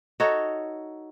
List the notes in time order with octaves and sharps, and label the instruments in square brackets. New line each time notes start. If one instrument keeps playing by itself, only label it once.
[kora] D#4 F#4 A4 C#5